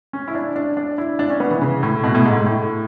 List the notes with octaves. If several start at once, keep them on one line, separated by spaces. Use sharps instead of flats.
C#4
E4
D4
D4
D4
E4
D4
C#4
B3
E3
C#3
A2
B2
A2
G#2
A2
A2